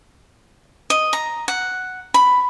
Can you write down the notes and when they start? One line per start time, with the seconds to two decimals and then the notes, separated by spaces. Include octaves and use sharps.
0.90 D#5
1.13 A#5
1.48 F#5
2.14 B5